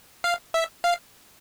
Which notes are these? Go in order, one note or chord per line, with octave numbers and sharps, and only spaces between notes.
F5
E5
F5